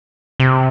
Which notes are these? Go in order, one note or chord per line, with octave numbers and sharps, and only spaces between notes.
C3